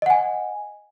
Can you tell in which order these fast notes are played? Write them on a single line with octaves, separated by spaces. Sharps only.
D#5 F#5 G#5